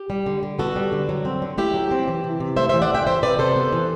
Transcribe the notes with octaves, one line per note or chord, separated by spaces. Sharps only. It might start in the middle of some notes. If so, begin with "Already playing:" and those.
Already playing: G4
G3
D3
D3
B3 F#4 A4
G3
D3
F#3
C4
D3
A3 E4 G4
F#3
C4
E3
C3
C3
A3 C5 E5
C5 E5
E3
D5 F#5
C3 E5 G5
E3 C5 E5
C3 B4 D5
C3 A4 C5
B3
E3